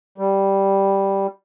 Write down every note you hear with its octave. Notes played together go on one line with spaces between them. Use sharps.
G3